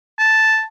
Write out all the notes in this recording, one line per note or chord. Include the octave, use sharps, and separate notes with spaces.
A5